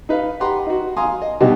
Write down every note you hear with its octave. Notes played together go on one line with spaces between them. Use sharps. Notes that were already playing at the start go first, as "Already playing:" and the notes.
D#4 B4 F5
G4 B4 F#5 A#5 C6
D#4 F#4
F5 G#5 A#5 C6 D#6
D#5
B1 G2 B2 G4 D#5